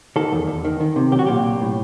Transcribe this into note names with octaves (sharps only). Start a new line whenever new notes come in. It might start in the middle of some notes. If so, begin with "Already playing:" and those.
D#3 A4
E2
E2
D#3
D#3
C3
B1 G4
F#4
A#2 G4
B1
A2